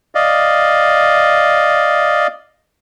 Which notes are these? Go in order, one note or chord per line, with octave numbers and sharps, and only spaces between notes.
D5 D#5 F5